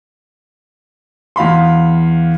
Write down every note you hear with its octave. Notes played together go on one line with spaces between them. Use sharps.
E2 F5 B5 C6